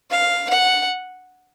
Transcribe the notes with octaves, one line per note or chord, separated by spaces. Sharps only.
F5
F#5